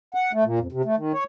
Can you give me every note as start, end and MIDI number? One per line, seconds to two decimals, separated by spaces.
0.14 0.32 78
0.33 0.44 57
0.44 0.59 46
0.59 0.67 41
0.72 0.82 48
0.85 0.96 57
0.97 1.12 51
1.14 1.24 73